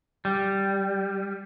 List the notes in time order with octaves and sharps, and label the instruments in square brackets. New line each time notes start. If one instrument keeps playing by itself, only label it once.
[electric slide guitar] G3